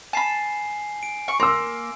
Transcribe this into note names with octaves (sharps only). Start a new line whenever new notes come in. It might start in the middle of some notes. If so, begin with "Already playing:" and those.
G#5 A5 B5 C7
D7
C#6
A#3 C6 E6